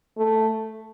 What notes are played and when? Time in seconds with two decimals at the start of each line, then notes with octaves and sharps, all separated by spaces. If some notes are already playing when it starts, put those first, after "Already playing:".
0.18 A3